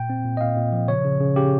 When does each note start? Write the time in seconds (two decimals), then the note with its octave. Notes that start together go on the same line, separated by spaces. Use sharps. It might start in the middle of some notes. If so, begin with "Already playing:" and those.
Already playing: A#2 G5
0.10 C4
0.25 A#2
0.37 D#5
0.41 A#2 F5
0.57 A#2
0.72 F3
0.88 C#3 C#5
1.04 C#3
1.20 C#3
1.36 C#3 G4